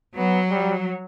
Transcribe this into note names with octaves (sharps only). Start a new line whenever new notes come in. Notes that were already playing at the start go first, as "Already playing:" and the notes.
F#3 B3
G3